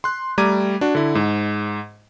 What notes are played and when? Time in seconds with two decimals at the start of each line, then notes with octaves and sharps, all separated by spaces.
0.04 C6 F#6
0.38 G3 A3 A#5 D6 G#6 D#7
0.81 D4 F#4
0.95 D3 E4
1.15 G#2